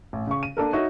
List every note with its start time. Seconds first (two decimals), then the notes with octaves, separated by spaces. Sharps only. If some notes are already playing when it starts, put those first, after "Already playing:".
0.13 A1
0.27 C#3 C#6
0.43 D#7
0.57 A#3 D4 A4 A#4
0.73 D#4 F#4 C#5 E5